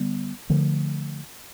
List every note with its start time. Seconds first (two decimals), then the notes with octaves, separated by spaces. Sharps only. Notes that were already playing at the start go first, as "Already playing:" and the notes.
Already playing: D3 G3 B3
0.50 D3 F3 A3